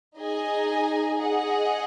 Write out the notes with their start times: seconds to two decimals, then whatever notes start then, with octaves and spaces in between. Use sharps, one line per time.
0.17 D#4 G#4 D#5 G#5
1.19 G#4 D#5 F#5